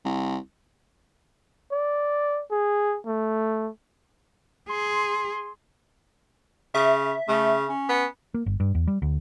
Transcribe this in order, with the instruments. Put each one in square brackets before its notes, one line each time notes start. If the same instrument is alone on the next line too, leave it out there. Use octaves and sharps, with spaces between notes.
[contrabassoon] C2
[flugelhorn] D5
G#4
A3
[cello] G#4 [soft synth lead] C6
[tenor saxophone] C#3 [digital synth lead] E5
[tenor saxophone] C#3 [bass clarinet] A3
[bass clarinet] C#4
[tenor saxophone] B3
[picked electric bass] A#3
G1
G2
E2
G3
D2